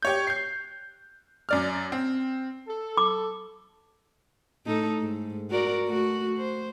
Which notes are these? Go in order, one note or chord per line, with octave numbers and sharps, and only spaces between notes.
G4 C#5 G6
G6 C7
F#2 D5 F6
C4
A4
D6
A2 D#4 A4
G#2
F#4 A#4 D5
A3 F#4
C5